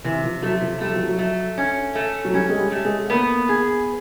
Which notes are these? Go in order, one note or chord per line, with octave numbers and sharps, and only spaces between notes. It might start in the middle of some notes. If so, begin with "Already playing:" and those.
C3 E3
F3
F#3 A3
F3
G3 A3
F#3
F3
F#3
A3
C#4
A3
F#3
G3 C#4
G#3
G3
A3
G#3
A#3 B3
G#4